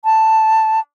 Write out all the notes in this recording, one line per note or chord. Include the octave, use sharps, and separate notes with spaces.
A5